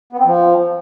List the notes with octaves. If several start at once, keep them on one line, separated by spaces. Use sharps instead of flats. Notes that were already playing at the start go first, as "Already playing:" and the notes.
B3
C4
F3